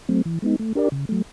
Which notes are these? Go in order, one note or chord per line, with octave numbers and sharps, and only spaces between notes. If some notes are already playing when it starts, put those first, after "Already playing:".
F#3 A3 C4
E3
G#3 B3 D#4
A3
D4 G4 A#4 D5
C#3
F#3 A3